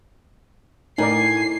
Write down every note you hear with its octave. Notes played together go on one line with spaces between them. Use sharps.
A2 D#4 A#4 D5 G#5 C7